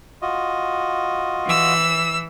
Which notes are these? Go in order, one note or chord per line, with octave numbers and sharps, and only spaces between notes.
F4 F#4 D#5
E3 E6